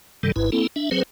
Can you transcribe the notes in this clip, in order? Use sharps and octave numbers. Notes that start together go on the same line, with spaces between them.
G2 C3 D#3 G3 A4
G#1 G#2 E4 B4
A#3 C4 E4 A4
D4 E5
F#3 C4 G#4 B4 C5